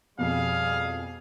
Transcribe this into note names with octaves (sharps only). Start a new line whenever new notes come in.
F2 B2 G3 G#4 F5